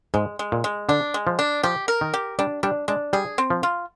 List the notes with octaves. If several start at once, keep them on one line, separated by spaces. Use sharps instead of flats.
G#2 G#3
G#3
A#2
G#3
D3 D4
G#3
F3
D4
F3 G4
A#4
D#3
G4
G3 D4
G3 D4
G#3 D4
G3 G#4
C4
F3
F4